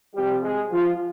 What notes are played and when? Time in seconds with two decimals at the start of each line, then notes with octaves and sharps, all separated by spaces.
0.15 C3 F3 G3 G4
0.43 G#3 G#4
0.71 F3 F4